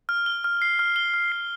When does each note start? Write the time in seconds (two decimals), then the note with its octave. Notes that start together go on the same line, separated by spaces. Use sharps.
0.09 F6
0.26 G7
0.44 F6
0.62 C7
0.79 F6
0.96 G7
1.14 F6
1.32 C7